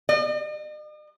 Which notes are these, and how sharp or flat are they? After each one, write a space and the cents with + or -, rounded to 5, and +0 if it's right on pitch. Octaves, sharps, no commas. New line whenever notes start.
D#5 -45